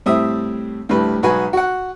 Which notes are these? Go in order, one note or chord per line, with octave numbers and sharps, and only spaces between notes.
A2 G3 C4 E5 D#6
D2 A2 G3 B4
B1 G#3 F#4 G#4 B4 G#5
F#4 F#5